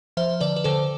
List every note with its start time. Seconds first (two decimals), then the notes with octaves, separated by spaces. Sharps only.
0.17 F3 C5 E5
0.40 D3 B4 D5
0.56 B4
0.64 D3 A4 C5